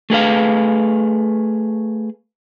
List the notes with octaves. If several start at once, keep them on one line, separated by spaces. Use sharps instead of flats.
A3 G#4 B4 F5